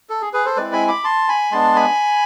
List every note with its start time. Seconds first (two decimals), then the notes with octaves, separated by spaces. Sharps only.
0.10 A4
0.22 G#4
0.33 G#4 B4
0.45 A4 C5
0.56 G#3 C4 E4 B4 D5
0.73 G#5 B5
0.88 B5 D6
1.04 A5 C6
1.28 G#5 B5
1.51 G#3 B3 D4 A5 C6
1.76 G#5 B5